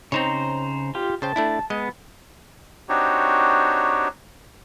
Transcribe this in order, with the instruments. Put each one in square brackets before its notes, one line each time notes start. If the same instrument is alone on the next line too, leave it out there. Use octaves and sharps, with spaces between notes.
[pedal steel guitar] C#3 C5 A#5 [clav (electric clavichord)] C4 D#4 C#5
[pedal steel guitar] F4 G4
[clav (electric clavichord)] C#3 C5 G5 [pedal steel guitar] A5
[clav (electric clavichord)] A3 D4 E4
[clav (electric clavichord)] G#3 D#5 [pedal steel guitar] B3
[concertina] C4 D4 D#4 F#4 G4 C#5